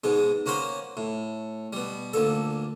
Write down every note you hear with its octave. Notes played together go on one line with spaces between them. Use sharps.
G#2 B2 G#3
A#3 C#4 F#4 A#4 C5
A2
B2 G3
D2 A#2 A4